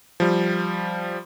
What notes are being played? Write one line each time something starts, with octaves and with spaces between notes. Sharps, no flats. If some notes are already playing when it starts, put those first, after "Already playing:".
F3 G3